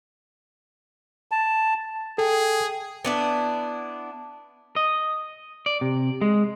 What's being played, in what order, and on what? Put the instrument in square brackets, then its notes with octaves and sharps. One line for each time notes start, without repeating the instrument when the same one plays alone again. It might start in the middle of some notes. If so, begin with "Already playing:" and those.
[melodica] A5
[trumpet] G#4 [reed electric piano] A4 [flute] G5
[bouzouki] B3 D4 E4
[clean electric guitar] D#5
D5
C3
G#3